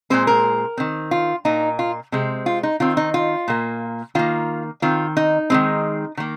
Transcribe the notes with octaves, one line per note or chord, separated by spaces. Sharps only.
A#2 G#3 C4 C5
A#4
D#3 C4
F4
A#2 A#3 D#4
F4
C3 G#3 C4
F4
D#4
D#3 C4 F4
D#4
F4
A#2 A#3
D#3 A#3 F4
D#3 C4 F4
D#4
D#3 G#3 C4
D#3 A#3